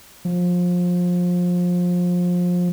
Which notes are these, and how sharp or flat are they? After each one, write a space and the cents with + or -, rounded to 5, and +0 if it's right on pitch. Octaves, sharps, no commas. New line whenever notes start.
F3 +25